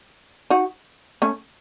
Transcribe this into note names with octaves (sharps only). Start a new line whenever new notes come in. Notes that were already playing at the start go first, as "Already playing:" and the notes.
D#4 F#4
A3 C#4